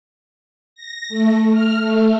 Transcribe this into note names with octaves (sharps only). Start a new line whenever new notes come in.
A#6
A3
F6
A3